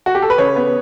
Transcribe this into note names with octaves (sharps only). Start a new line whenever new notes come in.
F#4
G4
A4
B4
C#3 C#5
B3